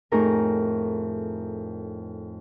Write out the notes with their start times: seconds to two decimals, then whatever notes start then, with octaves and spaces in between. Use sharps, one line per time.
0.12 F2 A2 D#4 G#4 A#4 A#5